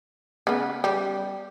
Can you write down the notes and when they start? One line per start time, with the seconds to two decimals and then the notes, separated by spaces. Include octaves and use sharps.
0.47 C#3 B3
0.84 G3